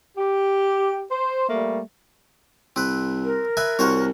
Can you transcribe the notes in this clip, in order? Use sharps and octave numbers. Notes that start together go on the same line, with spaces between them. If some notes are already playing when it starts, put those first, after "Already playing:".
G4
C5
G3 A3 A#3
C2 C4 B4
A#4
B4 E5 G#5
C2 F#4 C5 C#5